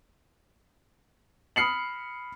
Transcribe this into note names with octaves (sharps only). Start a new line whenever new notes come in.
B5 D#6 F6 C7 C#7 F#7